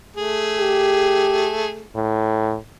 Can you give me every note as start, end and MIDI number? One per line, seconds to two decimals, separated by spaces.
0.16 1.83 57
0.16 1.83 68
0.59 1.52 67
1.96 2.57 45